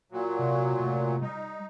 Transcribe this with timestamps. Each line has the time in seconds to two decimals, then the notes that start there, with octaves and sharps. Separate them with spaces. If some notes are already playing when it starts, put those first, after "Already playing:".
0.12 A#2 F#3
0.39 C3
0.78 A2 C3 F4
1.22 G3 D#4